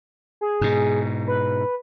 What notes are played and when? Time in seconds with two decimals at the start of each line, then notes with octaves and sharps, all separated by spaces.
0.41 G#4
0.61 G#2 B2
1.27 B4